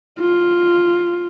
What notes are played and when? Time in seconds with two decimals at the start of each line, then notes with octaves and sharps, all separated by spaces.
0.20 F4